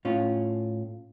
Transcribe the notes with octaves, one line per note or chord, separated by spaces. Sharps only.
A2 C#4 F4